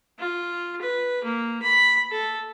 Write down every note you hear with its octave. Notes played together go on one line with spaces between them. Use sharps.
F4
B4
A#3
B5
A4